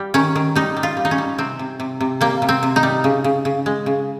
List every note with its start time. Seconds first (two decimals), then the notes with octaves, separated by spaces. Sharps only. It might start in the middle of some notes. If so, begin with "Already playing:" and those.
Already playing: G3
0.14 D#3 C#4
0.35 D#3
0.55 G3 D#4
0.77 G3
0.83 F4
0.97 G3
1.05 D#4
1.11 C#4
1.18 G3
1.38 C3 C4
1.59 C3
1.80 C3
2.01 C3
2.21 G3 A#3
2.42 C3
2.49 C4
2.63 C3
2.76 D#4
2.83 G3
3.04 C#3
3.24 C#3
3.45 C#3
3.66 G#3
3.86 C#3